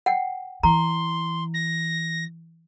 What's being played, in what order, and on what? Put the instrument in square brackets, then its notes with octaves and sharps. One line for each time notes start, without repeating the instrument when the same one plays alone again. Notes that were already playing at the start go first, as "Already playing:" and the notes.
[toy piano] F#5 G5
[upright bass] E3 [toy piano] A#5 [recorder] C6
[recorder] A#6